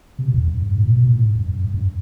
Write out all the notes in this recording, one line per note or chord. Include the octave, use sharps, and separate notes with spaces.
C3
B2
F#2
F2
F#2
G2
A2
A#2
B2
A#2
A2
G#2
F#2
F#2
G2
F#2